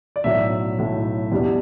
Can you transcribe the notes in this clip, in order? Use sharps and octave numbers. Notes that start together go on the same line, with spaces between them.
D5
B1 A2 F#3 E5
B1 A2 F#3
E2 B2 G3 D4